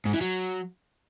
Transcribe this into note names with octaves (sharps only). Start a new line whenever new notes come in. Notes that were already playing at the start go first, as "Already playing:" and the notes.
G#2
E3
F#3